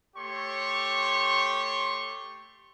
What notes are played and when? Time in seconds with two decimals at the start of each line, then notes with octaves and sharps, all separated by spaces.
0.16 A3 G4 C#5 C6 C#6